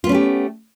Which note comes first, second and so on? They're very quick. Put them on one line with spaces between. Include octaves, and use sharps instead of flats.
F4 B3 C#4 A3 G4